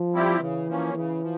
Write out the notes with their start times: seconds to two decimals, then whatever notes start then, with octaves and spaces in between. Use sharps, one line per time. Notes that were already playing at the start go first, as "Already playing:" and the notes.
Already playing: F3
0.13 G3 C4 E4 G4
0.40 C#3 E3
0.67 F3 A#3 C#4
0.94 C#3 E3
1.22 F3